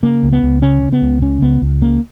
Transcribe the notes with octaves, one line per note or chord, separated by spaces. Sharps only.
C#3 A#3
C#2
B3
C#2
C#3 C#4
C#3
B3
C#2
C#3 C#4
C#2 B3
C#2
C#3 A#3